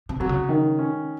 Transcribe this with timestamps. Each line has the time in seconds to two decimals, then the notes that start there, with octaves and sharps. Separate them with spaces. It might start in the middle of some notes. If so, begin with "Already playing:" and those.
0.09 C3
0.20 C3 F#3
0.29 C#3
0.49 D#3
0.79 C#4